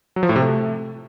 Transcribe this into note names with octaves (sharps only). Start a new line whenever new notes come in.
F#3
F3
A2
C3
A3